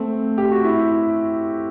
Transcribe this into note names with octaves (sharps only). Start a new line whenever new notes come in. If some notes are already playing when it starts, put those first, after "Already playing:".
Already playing: A3 C4
G4
F#4
E4